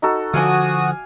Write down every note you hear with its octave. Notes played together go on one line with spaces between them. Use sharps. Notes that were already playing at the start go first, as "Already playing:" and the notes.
D#4 F#4 A4
D3 F3 F#4 F5 G#5 D6 D#6